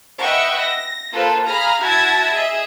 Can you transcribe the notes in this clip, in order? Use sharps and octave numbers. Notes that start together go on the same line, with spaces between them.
B4 D#5 E5 F#5 G5 C#6
A#6
A#3 F4 A4 B4 C5
G#4 F5 A#5 B5 F6 A#6
E4 F#4 E5 A5 G#6 A#6
G#4 D#5 E5